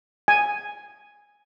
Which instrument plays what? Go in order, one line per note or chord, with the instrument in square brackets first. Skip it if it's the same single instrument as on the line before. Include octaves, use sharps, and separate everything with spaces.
[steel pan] G#5